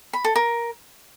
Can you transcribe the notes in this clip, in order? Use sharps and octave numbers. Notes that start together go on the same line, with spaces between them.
B5
A4
A#4